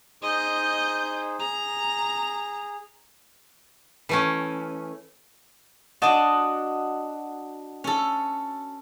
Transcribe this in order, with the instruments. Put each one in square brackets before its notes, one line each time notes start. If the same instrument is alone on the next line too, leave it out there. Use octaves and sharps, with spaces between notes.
[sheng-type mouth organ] D#4 G#4 C5 [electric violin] D#5 G6
[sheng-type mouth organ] G#4 [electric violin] A#5
[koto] E3 A3 C#4
[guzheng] D4 A5 [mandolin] F#4 D#5
[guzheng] C#4 A4